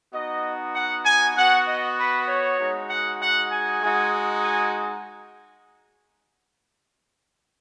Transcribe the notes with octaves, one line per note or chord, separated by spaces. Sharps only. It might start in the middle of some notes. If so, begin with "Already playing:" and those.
B3 D#4 F#4 D#5
F#5
G#5
B3 F#4 F#5
D#5
B4
C#5
G#3 D#4 F#4
F#5
F#5
G#5
G#3 D#4 F#4
G#5